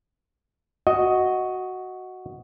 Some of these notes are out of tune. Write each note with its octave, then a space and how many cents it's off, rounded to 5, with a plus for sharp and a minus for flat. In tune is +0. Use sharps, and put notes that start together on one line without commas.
F#4 +0 D#5 +10